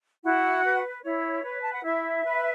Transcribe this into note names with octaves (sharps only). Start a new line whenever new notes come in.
E4 F#4 F#5
B4
E4 C#5
B4
A5
F#5
E4 E5
B4